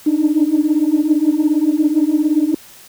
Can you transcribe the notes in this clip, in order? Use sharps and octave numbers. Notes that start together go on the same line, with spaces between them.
D4 D#4